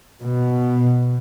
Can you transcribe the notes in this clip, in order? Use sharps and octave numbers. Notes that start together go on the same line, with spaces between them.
B2